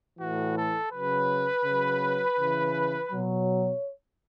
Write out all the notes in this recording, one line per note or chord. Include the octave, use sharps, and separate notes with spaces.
A2 E3 F#4
A4
C#3 F#3 B4
C#3 F#3
C#3 E3
B2 F#3 C#5